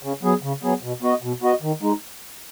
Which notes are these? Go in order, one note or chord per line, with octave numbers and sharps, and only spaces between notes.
C#3
F#3 B3 G#4
C#3
F#3 B3 G#4
B2
B3 F#4 D#5
B2
B3 F#4 D#5
D#3
G#3 D#4